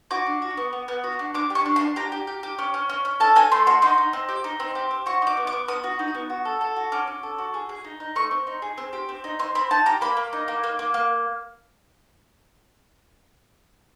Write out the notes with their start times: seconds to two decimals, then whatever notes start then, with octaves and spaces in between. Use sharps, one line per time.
0.11 F#4 D6
0.26 D4
0.42 F#4
0.57 B3
0.73 B3
0.88 B3
1.04 F#4
1.19 D4
1.34 D4 D6
1.50 G4
1.55 C#6
1.66 D4
1.76 D4 C6
1.96 G4 A#5
2.12 G4
2.27 G4
2.43 G4
2.58 C#4
2.74 C#4
2.89 C#4
3.05 C#4
3.20 A4 A5
3.36 A4 G#5
3.51 A3 C6
3.67 F#4 C6
3.82 D#4 C6
3.98 D#4
4.13 C4
4.29 G4
4.44 D#4
4.60 C4
4.75 G4
4.91 C4
5.06 F#4 C#6
5.22 D#4 D6
5.37 B3
5.47 D6
5.52 B3
5.68 B3 D#6
5.84 F#4
5.99 D#4
6.15 B3
6.30 F#4
6.45 A4
6.61 A4
6.76 F#4
6.92 C#4 D6
7.07 C#4
7.23 A4
7.38 F#4
7.54 G#4
7.69 G#4
7.85 D#4
8.00 D#4
8.16 A3 C#6
8.31 C4
8.47 D#4
8.62 G#4
8.78 C4
8.93 G4
9.09 C4
9.24 D#4
9.39 C4 C6
9.55 C4 B5
9.71 D#4 A5
9.86 G4 A#5
10.01 A#3 B5
10.17 A#3
10.33 D#4
10.48 A#3
10.63 A#3
10.79 A#3
10.94 A#3